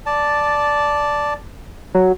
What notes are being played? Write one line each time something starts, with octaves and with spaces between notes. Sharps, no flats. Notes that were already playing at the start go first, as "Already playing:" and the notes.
D5 A5
F#3